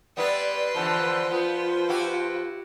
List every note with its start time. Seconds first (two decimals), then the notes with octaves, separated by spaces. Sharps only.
0.17 G3 B3 E4 B4 D5 C6
0.75 E2 D3 E3 F3 C5 A5
1.31 B3 F4 B4
1.89 E4 F#4 G4